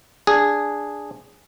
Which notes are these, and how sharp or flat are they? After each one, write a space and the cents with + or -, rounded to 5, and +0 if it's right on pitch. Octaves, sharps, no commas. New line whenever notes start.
D4 +0 G#4 -5